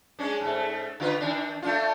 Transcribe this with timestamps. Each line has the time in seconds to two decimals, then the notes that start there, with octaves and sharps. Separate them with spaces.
0.19 G#3 C#4 D4
0.41 G#2 A3
1.00 D3 F4 B4
1.20 D#3 D4
1.62 A3 D4 F4